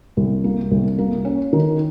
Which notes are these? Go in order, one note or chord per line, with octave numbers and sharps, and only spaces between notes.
C2
A#3
C2
A#3
C#4
D#3